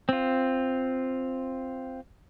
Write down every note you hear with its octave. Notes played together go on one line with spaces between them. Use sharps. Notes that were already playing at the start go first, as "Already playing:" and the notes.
C4 F4